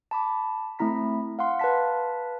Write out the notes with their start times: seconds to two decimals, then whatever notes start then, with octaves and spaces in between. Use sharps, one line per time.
0.11 A5 B5 D6
0.79 A3 C4 E4 A#5 B6
1.39 F5 F#5 C6
1.59 B4 F5 A5 B6